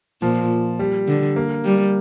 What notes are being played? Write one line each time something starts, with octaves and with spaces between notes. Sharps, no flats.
A#2 F3
G3
D3
A#3
G3